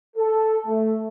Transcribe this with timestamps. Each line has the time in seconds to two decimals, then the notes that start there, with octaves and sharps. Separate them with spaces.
0.17 A4
0.67 A3